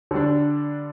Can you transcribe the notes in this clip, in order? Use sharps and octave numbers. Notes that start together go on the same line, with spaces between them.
D3 G3 D4